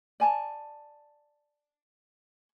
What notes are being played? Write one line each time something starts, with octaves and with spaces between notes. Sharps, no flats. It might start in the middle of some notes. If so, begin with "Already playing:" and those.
D5 G#5 A5